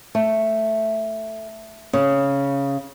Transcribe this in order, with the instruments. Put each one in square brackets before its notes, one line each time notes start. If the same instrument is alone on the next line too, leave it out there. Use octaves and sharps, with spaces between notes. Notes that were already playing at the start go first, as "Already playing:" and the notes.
[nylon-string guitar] A3
C#3